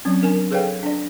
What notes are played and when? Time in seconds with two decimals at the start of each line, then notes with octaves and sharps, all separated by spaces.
0.05 F3 F#3 C4 C#4
0.22 D4 A#4 G#5
0.51 G#4 A4 B4 C#5 F5 G5
0.83 D4 D5